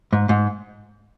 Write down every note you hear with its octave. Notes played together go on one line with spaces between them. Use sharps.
G#2
G#2